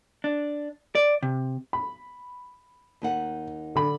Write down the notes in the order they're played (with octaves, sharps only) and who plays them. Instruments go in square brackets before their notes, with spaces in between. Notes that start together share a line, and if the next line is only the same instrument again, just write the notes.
[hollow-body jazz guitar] D4
D5
C3
[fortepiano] B5
[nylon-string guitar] D#2 D#4 F#5
[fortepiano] D3 B5